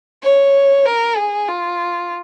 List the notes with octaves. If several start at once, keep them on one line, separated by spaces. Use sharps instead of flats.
C#5
A#4
G#4
F4